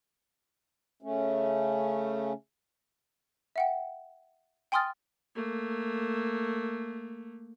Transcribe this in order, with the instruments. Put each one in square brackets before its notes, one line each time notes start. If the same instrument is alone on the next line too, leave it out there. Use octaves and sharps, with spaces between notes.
[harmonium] C#3 A3 C#4
[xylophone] E5 F#5 G5
G5 G#5 C6 D#6 F6 A6
[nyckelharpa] A3 A#3